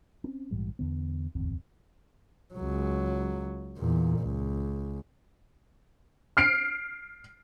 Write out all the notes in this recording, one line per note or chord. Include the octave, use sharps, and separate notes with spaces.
C4 C#4
A#1 G#2 E3 G3
E2 D3 B3
D1 G1 E2 C4
C#2 F#3
E2 A#2
C#2
F6 C7 D7